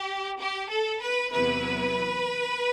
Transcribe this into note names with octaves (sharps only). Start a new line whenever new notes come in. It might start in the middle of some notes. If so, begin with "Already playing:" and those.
Already playing: G4
G4
A4
B4
E2 C3 F#3 B3 E4 B4